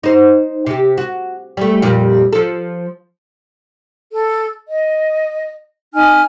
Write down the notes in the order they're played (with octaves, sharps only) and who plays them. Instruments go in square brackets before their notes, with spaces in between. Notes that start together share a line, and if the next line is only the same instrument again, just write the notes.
[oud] D#4 C5
C3 G4
F#4
G3 A3
F2 A#2 G3
F3 A4
[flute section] A4
D#5
D#4 G#5 F6